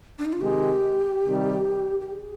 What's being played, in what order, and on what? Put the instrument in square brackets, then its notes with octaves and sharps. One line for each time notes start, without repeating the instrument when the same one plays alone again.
[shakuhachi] D4
D#4
F4
[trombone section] C3 D#3 G#3 [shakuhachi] G4
[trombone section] C3 D#3 G3
[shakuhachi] G4
G#4